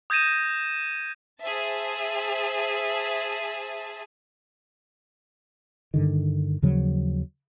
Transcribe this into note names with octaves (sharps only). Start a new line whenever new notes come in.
D#6 G6 G#6 A#6 D#7 E7
G#4 C5 E5 A5
G2 D3 D#3
D#2 C#3 F3 F#3